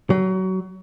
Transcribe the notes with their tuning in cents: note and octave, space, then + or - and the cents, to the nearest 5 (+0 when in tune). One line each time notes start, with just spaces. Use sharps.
F#3 +25